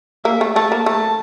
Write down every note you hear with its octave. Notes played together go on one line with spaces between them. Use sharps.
A#3 E5
A3
A3 A5
A#3
A3 A5